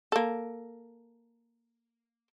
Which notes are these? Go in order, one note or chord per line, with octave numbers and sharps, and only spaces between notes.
A#3 A4